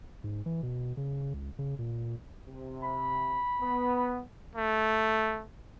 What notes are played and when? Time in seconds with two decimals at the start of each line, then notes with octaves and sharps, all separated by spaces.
0.24 G#2
0.46 E3
0.63 B2
0.97 C#3
1.34 C#2
1.59 C#3
1.79 A#2
2.46 C3
2.83 B5
3.61 B3
4.56 A3